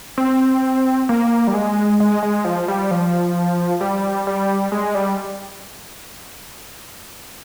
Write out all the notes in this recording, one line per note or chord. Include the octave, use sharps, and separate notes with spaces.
C4
A#3
G3
G#3
G#3
G#3
F3
G3
F3
G3
G3
G#3
G3